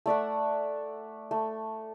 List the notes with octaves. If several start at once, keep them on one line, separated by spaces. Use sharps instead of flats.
A3 D5 E5 F#5
A3